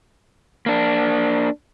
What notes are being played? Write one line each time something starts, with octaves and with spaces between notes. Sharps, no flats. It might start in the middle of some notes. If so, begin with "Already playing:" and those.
A#3 D4